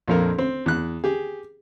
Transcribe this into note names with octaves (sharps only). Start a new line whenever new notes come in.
A#1 F2 A#4
C4
E2 F#6
G4 G#4